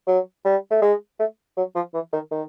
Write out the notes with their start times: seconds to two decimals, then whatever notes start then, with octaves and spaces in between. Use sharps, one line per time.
0.07 F#3
0.45 G3
0.71 A3
0.82 G#3
1.19 A3
1.57 F#3
1.75 F3
1.94 E3
2.13 D#3
2.31 D#3